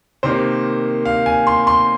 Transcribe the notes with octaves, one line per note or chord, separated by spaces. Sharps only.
C3 D#3 A#3 C5
F5
G#5
C6
C6